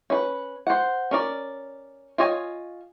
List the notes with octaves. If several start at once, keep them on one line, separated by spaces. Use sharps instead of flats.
C#4 B4
C5 F#5
C#4 A#4 D5
F4 C#5 D#5 G#5